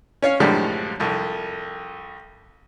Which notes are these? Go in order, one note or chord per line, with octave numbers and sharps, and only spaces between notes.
C#4 C#5 F5
F#2 A2 D3 F3 G3 G#3
C2 F2